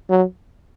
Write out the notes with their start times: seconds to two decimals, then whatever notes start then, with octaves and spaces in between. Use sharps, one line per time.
0.09 F#3